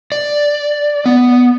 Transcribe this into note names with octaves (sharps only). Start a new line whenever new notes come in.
D5
B3